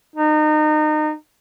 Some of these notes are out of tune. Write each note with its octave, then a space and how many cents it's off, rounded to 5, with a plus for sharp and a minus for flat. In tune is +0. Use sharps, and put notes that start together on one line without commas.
D#4 -30